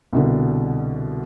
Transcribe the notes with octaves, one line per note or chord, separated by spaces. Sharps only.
C2 B2 D3